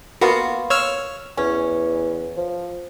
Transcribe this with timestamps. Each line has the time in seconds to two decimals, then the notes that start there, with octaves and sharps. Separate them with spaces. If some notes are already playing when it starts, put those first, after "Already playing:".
0.21 A#3 B3 F4 F#4
0.70 C#5 E6 F6
1.37 E2 C#4
2.37 F3